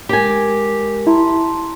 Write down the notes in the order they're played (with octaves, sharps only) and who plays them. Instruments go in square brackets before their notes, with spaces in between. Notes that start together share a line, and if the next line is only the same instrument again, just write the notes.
[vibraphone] G#3 A#4 [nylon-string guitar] G4 G#5
[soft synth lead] E4 [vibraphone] A5 A#5 C6